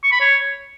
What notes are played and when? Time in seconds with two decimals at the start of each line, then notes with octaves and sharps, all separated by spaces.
0.04 C#6
0.12 B5
0.21 C#5